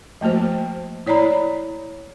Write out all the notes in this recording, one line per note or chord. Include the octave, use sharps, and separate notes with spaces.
F3 A3 A#3 F#4 C5
E4 C#5 D5 A#5 B5